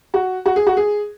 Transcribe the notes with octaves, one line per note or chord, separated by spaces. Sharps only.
F#4
F#4
G#4
F#4
G#4